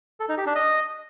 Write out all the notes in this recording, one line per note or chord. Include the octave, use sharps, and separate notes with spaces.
A4
D#4
G4
D4
D#5